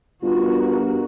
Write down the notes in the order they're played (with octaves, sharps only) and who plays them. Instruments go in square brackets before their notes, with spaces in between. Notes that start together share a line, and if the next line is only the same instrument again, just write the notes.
[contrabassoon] G2 [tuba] B3 [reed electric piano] F4 [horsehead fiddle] F#4 A#4